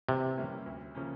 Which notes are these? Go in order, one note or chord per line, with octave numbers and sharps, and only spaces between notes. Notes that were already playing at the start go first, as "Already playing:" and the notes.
C3 E3
G3 A#3 C#4 E4
D2
C#3 F3 A#3 C#4